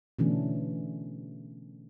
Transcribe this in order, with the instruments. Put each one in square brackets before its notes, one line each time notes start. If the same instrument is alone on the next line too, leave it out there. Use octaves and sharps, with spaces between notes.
[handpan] B2 D3 E3 A3 C#4 D4